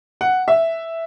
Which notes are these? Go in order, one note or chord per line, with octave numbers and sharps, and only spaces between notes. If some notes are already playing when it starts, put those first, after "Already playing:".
F#5
E5